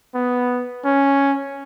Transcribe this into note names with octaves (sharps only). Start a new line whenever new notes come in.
B3
C#4